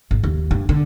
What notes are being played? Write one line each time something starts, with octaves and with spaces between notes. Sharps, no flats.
G#1
D#2
G2
D3